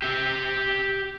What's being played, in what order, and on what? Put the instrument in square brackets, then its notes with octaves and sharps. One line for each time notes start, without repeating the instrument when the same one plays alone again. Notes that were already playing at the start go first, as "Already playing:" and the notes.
[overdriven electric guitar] G4 E5